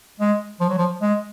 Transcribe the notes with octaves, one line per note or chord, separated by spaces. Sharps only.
G#3
F3
F#3
F3
G#3